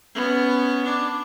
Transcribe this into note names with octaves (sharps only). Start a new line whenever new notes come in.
B3 C#4
D4